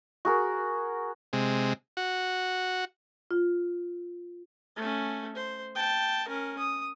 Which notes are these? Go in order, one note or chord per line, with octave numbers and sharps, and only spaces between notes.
F#4 G#4 A#4
C3 G#3
F#4
F4
A3 C#4
C5
G5 A5
C#4 A#4
D#6